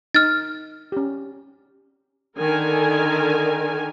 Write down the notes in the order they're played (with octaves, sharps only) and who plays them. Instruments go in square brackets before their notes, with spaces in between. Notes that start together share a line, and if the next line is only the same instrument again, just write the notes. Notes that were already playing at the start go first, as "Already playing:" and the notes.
[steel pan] D#4 [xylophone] F6 A6
[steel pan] C#4 G4
[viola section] D3 D#3 A#4 G#5